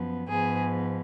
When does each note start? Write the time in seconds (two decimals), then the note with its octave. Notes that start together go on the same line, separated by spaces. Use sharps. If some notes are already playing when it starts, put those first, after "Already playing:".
Already playing: F#2 F3 B3
0.28 G#2 F3 B3 G#4